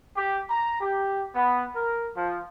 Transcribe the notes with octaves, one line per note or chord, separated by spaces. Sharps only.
G4
A#5
G4
B3
A#4
F3